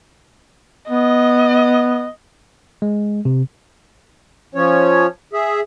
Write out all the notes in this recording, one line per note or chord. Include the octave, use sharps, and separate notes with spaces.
B3 D#5
G#3
C3
F3 C#4 C#5
G#4 E5